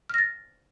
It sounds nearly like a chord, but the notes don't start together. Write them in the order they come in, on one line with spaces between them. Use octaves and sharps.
F6 A#6 A6